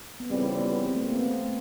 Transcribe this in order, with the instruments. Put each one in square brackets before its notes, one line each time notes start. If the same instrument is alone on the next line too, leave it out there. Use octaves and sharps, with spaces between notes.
[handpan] B3
[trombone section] F2 C#3 E3 G3 [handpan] C4
[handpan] B3
C4
A3
A#3
B3
C4